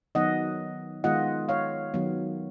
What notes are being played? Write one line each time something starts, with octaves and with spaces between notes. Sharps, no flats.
D#3 F#3 B3 D#4 D#5 F#5
D#3 G#3 B3 F4 D#5 F#5
C#5 F5
D#3 F#3 B3